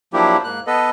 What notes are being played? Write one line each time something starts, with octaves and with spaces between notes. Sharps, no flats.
F3 F#3 A#3 D4 E4 G4
G#2 A#3 F#6
B3 A4 B4 D#5